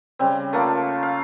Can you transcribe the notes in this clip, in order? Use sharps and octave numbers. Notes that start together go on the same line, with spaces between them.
C#3 G3 C4
A3 A#3 F4 A5
F5